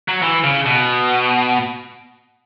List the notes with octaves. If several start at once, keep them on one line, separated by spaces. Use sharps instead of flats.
F#3
E3
C#3
B2